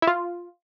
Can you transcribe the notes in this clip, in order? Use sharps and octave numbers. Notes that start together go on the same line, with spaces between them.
E4
F4